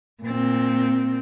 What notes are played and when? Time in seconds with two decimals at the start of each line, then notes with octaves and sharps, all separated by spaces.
0.23 A#2 C4